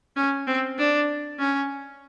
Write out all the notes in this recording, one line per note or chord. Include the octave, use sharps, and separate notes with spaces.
C#4
C4
D4
C#4